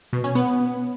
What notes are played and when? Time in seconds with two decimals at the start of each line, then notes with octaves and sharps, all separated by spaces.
0.13 B2
0.24 C#4
0.35 B3